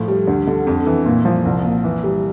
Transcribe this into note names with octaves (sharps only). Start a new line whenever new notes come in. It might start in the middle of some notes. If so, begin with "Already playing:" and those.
Already playing: A2 F3
G3
D2
D3
F2
E3
A#2
F3
C2
A#2
E3
G3